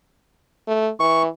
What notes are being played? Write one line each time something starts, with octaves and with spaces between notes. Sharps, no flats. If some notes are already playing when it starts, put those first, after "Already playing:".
A3
E3 C#6